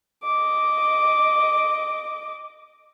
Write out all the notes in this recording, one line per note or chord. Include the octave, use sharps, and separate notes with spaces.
D#5 D6